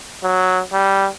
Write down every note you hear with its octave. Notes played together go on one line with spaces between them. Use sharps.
F#3
G3